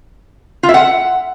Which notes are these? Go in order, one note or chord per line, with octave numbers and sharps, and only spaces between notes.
F4
E5
F#5